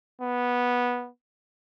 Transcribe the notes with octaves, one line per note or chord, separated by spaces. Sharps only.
B3